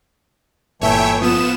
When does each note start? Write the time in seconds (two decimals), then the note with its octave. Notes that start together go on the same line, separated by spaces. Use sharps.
0.81 G1 A#2 E3 A3 C#5 E5 G5
1.22 F3 B3 D#6 E7